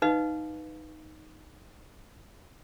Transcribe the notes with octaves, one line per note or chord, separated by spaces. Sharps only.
D#4 B4 D#5 F5